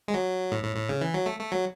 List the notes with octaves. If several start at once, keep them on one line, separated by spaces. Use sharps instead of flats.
G#3
F#3
A2
A2
A2
C#3
E3
F#3
A3
A3
F#3